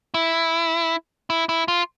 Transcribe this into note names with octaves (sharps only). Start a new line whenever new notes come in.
E4
E4
E4
F4